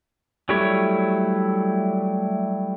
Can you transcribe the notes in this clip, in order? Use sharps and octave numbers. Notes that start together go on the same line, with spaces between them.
F#3 G3 A3 E4 C#5